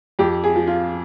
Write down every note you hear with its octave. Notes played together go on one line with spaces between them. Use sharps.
F2 G4
G#4
F3
F4